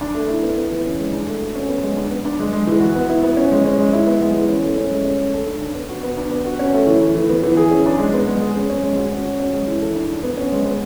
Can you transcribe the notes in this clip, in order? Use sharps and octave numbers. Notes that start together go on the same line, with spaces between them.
D4
A3
E4
B3
B3
E3
C#4
G#3
D4
A3
F#4
C#4
B3
G#3
D4
B3
D4
G#3
G#3
E3
F#4
B3
E4
B3
C#4
G#3
C#4
G#3
E4
B3
G#3
E3
C#4
A3
C#4
G#3
C#4
A3
A4
D4
D4
B3
F#4
B3
D4
B3
F#4
C#4
A3
E3
A3
E3
B3
E3
G#4
C#4
D4
G#3
B3
G#3
G#4
C#4
C#4
G#3
F#4
C#4
F#4
C#4
G#3
E3
A4
D4
D4
B3
C#4
G#3
B3